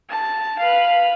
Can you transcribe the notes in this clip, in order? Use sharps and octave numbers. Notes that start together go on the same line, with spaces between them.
A5
B4 F5